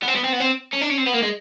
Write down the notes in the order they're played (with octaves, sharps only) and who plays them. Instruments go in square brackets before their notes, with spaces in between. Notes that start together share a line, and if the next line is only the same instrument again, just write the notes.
[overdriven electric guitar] B3
C4
B3
C4
B3
C4
C#4
D4
C#4
C4
B3
A#3
G#3